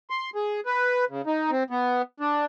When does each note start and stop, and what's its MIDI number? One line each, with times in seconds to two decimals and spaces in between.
0.10 0.30 84
0.35 0.60 68
0.66 1.05 71
1.10 1.22 49
1.27 1.51 63
1.51 1.63 60
1.70 2.02 59
2.20 2.45 62